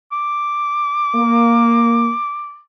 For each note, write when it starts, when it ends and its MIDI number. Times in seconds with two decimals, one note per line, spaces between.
0.12 2.60 86
1.16 2.11 58